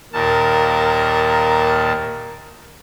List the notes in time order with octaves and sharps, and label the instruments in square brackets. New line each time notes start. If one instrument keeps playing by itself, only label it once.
[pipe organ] D#2 A#2 A5 [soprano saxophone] A#4